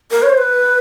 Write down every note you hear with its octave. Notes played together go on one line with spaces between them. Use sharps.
A#4
C#5
C5
B4